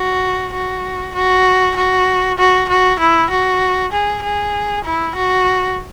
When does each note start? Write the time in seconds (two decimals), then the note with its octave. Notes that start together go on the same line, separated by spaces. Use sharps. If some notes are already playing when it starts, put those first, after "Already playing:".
Already playing: F#4
0.53 F#4
1.15 F#4
1.77 F#4
2.38 F#4
2.69 F#4
3.00 E4
3.30 F#4
3.92 G#4
4.23 G#4
4.84 E4
5.15 F#4